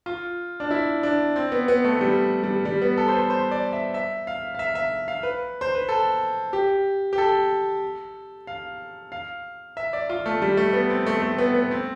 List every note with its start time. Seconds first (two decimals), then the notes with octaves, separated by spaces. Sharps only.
0.06 F4
0.60 D4
0.71 E4
1.03 D4
1.36 C4
1.52 B3
1.68 B3
1.84 A3
2.01 G3
2.43 G3
2.65 G3
2.82 B3
2.97 A4
3.08 C5
3.14 B4
3.30 C5
3.51 D5
3.73 E5
3.94 E5
4.27 F5
4.55 F5
4.59 E5
4.75 E5
5.08 F5
5.23 B4
5.61 C5
5.75 B4
5.89 A4
6.53 G4
7.13 G4
7.18 A4
8.47 F5
9.12 F5
9.77 E5
9.93 D5
10.09 F4
10.26 A3
10.42 G3
10.57 A3
10.73 B3
10.90 C4
11.06 A3
11.22 A3
11.38 B3
11.55 B3
11.71 C4